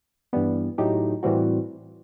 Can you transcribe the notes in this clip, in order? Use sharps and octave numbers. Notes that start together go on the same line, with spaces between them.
G2 E3 G3 B3
A2 F#3 A3 D#4 G4
A2 E3 G3 C4 F#4